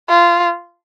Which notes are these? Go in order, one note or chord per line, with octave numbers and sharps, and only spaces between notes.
F4